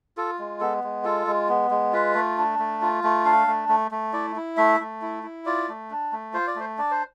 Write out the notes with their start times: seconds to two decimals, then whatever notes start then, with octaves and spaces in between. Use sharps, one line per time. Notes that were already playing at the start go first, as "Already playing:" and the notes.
0.17 F4 A4
0.39 G#3
0.60 B3 A4
0.84 G#3
1.04 F4 A4
1.27 G#3
1.49 B3
1.71 G#3
1.93 F4 B4
2.15 A3
2.38 D4
2.59 A3
2.82 F4
3.04 A3
3.25 D4 F5
3.47 A3
3.69 A3
3.91 A3
4.13 E4 D5
4.36 E4
4.57 A3 E5
4.80 A3
5.02 E4
5.23 E4
5.46 F4 D5
5.68 A3
5.90 D4
6.12 A3
6.34 F4 C5
6.47 D5
6.56 A3 C5
6.78 D4 D5
6.91 C5